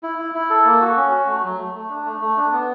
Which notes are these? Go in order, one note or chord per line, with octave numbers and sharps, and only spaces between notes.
E4
E4
E4
A4
A#3
F#4
C#4
F#4
A3
F#3
A3
A3
D4
A3
A3
D4
B3